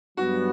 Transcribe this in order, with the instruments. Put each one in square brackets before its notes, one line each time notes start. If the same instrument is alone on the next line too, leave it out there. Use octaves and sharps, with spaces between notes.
[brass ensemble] G2 F#3 B3 [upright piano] F#4